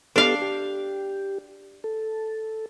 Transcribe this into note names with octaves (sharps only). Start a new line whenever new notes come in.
B3 D4 G4 A4 F5
G4
A4